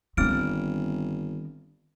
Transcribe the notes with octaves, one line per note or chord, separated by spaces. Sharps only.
G1 D#3 G3 C4 F6 D7